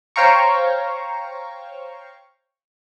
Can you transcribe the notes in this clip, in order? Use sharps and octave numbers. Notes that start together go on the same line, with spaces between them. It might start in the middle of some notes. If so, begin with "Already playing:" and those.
C5 C#5 F5 G5 A#5 C#6